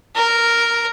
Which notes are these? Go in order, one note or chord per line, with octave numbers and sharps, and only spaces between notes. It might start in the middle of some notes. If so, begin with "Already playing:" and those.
A#4